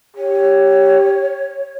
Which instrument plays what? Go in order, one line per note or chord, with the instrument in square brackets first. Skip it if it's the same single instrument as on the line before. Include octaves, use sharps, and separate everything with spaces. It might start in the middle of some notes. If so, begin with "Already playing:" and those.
[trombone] G4 [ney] C#5